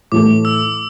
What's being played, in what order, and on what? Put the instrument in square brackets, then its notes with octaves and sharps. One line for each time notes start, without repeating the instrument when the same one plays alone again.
[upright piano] A2 E3 A3 [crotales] D6
[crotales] E6